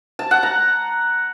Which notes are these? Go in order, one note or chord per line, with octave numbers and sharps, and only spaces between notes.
A5
F#5
A#5